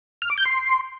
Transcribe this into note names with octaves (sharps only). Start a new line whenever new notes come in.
F6
D6
G6
C6